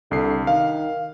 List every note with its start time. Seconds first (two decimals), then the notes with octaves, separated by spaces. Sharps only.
0.11 C2 D3 C7
0.47 D#3 F5